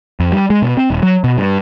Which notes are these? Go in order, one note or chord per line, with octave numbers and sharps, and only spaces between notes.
F2
G3
G#3
B2
C4
D#1
F#3
B2
G2